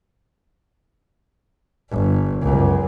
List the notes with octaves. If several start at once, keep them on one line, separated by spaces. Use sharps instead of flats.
G1
C#2 F#2